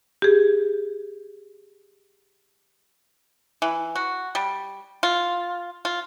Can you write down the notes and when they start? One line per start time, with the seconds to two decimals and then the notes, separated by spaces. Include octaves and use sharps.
0.22 G4 G#4
3.62 E3
3.95 F#4
4.35 G3
5.03 F4
5.85 F4